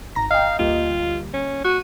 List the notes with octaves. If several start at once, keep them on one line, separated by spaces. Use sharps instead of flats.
G#1 A#5 A#6
D#5 F5 G5
D2 G3 A#3 F4
C#4
F#4 D#7